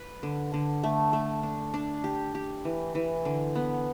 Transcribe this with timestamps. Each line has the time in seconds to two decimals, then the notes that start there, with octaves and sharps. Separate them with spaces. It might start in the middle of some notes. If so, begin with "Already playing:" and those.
Already playing: B4
0.23 D3
0.54 D3
0.84 A3
1.13 A3
1.43 D4
1.74 D4
2.04 G4
2.35 G4
2.65 E3
2.95 E3
3.25 D3
3.56 B3